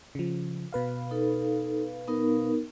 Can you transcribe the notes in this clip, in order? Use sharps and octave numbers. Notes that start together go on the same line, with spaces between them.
C#3 F3
B2 B4 F5
D#4 A4
B3 D#4 A#4